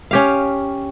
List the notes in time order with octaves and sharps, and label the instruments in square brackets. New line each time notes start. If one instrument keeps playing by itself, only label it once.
[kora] C#4 G4 F5